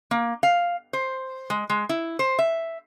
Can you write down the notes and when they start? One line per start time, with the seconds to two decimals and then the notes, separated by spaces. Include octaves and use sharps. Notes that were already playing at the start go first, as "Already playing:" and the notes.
0.11 A#3
0.43 F5
0.93 C5
1.50 G#3
1.70 G#3
1.89 E4
2.19 C5
2.39 E5